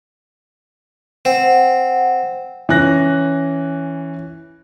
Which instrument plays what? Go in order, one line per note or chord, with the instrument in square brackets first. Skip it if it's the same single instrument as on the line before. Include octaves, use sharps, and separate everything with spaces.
[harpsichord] C4 [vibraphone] F#5
[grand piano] E3 C#4 F#6 A#6